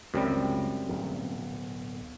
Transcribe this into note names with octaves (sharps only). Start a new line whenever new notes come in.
C#2 F#2 C3 G3
D1 B1 A#2